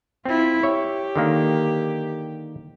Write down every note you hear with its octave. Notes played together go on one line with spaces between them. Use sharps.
C4 E4 F4
G4 C#5 E5
D3 D#3 A#3